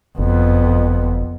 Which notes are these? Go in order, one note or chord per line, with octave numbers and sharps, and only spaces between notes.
F#1 F2 B3